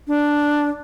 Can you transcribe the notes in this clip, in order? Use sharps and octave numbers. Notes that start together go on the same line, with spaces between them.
D4